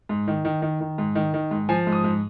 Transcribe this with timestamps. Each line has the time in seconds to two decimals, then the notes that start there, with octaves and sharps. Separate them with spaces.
0.09 G#2
0.28 D#3
0.45 D#3
0.62 D#3
0.81 D#3
0.98 G#2
1.15 D#3
1.34 D#3
1.51 G#2
1.69 F3 G#5
1.87 G#2
1.93 D#6
2.04 G#2